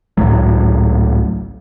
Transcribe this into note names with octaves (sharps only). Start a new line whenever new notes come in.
G#1 C#2 A2 F#3